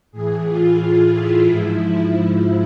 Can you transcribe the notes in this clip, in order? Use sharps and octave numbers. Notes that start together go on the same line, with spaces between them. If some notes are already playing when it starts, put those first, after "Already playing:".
A2 E3 G#4
F4
E4
G#2 F3
E4
E4